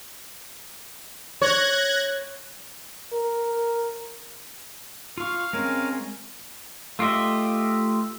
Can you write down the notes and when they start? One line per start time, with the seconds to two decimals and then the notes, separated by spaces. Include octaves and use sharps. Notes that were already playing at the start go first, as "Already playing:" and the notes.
1.42 C#5 F#6 G#6 A#6
3.13 A#4
5.18 F4 F5 C#6
5.53 G#3 C4 C#4 A#4 G#5
6.99 A3 F4 G4 D#5 E5